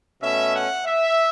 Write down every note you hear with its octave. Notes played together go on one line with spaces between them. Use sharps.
B2 A3 C#4 E5
F#5
E5